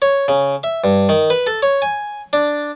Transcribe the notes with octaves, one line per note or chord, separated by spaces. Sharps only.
C#5
C#3
E5
G2
D#3
B4
A4
C#5
G#5
D4